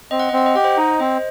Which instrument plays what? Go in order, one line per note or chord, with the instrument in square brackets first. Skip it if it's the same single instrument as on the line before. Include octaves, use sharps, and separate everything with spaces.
[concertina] C4 [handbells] D#5
[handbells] F#5
D#5
[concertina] C4 [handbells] F#5
[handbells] D#5
[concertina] G4 [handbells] F#5
[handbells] C5 D#5
[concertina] D#4
[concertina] C4 [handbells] C5 D#5